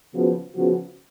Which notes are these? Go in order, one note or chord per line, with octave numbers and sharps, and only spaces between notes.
C#3 F3 B3 F#4
C#3 F3 B3 F#4